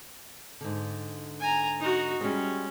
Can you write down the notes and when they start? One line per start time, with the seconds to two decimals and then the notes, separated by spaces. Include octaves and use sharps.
0.61 G#2 D3
1.40 G#5 A#5
1.80 D#4 F#4
2.21 G3 G#3 C#4